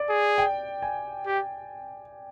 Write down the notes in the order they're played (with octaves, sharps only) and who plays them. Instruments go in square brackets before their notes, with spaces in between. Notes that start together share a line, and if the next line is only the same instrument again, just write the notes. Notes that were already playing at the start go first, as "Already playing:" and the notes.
Already playing: [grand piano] D5
[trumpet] G#4
[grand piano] G5
G#5
[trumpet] G4